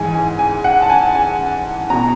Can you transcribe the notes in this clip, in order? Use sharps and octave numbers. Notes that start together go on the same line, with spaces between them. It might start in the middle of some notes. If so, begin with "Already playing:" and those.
Already playing: G#2 E3 G#5
G#5
G#5
F#5
A5
G#5
G#5
B2 A#5